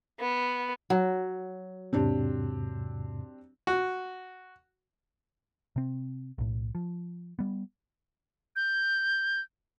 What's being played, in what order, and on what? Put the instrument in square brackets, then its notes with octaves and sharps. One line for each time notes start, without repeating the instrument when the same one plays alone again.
[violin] B3
[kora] F#3
[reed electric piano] E2 G#2 C3 [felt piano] C4 D4 G4
[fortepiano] F#4
[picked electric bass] C3 C4
B1 A2
F3
G3 B3
[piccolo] G6